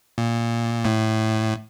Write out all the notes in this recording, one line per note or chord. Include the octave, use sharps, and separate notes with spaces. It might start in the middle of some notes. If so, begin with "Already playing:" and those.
A#2
A2